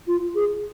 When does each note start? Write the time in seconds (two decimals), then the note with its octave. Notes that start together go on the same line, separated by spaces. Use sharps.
0.07 F4
0.35 G#4